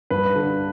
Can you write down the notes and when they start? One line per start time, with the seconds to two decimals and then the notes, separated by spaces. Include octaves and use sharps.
0.10 G2 B4
0.36 D3